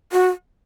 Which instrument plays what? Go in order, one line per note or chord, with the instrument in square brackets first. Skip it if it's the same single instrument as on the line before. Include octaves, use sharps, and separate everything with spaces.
[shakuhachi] F#4